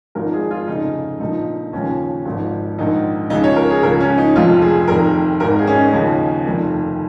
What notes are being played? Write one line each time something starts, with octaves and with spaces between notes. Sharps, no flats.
G#1 G#2 F3 A#4
G#4
F4
F1 F2 C#3 D#4
A#1 A#2 F3 D#4
D#2 C#3 F3 C#4
G#1 G#2 F3
A#1 G#2 D#3 D#4
C#2 C#3 F3 D#4
C#5
A#4
G#4
C#2 C#3 F3 A#4
C#4
D#4
F1 F2 F3 F4
G#4
F1 F2 D#3 A#4
G#1 G#2 D#3 A#4
G#4
C#4
D#4
D#2 C#3 F3
F1 F2 D#3